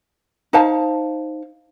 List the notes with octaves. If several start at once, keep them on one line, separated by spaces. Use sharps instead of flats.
D#4 C5 F5 A5